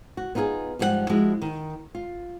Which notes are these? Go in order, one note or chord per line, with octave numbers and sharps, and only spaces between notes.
F#4
B3 D#4 F4 F#4 G#4
G#2 F3 G3 G#4 F#5
F3 G#3 E4 F#4
D#3
F4